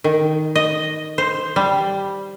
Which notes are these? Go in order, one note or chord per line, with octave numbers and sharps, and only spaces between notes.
D#3
D#5
C5
G3